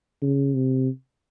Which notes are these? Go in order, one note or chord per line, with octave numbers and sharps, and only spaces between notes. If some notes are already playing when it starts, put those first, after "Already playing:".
C#3
C3